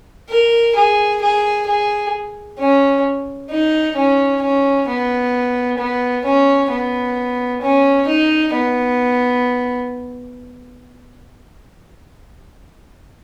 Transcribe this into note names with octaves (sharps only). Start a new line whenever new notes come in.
A#4
G#4
G#4
G#4
C#4
D#4
C#4
C#4
B3
B3
C#4
B3
C#4
D#4
B3